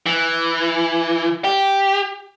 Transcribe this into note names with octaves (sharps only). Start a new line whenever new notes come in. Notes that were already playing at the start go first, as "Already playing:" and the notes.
E3
G4